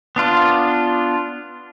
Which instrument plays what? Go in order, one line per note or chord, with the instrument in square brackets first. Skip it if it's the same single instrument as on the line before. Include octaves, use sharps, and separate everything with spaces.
[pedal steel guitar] B3 D4 F4